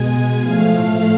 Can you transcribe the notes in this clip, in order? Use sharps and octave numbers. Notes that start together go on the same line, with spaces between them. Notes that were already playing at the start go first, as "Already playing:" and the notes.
Already playing: B2 G#3 G#5
A2 F3 A3 F5